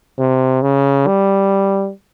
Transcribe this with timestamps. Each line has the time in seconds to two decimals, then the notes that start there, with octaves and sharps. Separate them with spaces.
0.19 C3
0.62 C#3
1.07 G3